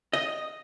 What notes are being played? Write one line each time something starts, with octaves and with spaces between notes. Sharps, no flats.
D#5